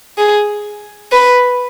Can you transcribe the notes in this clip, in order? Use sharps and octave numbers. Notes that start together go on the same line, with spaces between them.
G#4
B4